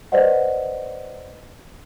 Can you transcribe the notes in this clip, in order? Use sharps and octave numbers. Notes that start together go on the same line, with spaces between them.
B4 C5 D5 D#5 F#5